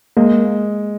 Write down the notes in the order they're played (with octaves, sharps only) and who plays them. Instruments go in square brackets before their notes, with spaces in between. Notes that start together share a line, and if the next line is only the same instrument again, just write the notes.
[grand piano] G#3 [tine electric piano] A#3